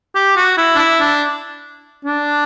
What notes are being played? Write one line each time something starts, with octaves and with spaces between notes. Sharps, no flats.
G4
F#4
E4
D4
E4
D4
D4